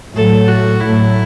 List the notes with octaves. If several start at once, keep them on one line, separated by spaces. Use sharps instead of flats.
A2 F#3 A3 A4
F#4
A2 F#3 A3 E4